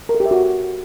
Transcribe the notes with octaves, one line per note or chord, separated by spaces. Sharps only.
A#4
A4
G4
E5
F#4